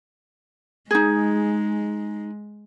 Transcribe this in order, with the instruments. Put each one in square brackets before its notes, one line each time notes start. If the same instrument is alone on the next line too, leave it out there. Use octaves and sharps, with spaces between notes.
[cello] G#3 [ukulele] D#4 G#4